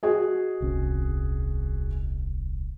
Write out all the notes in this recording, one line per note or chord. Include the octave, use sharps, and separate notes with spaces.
F#4 G#4 D#5
D#1 C2 C#4